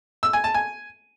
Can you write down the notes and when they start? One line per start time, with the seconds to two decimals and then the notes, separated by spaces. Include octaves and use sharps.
0.23 E6
0.33 G#5
0.44 A5
0.54 G#5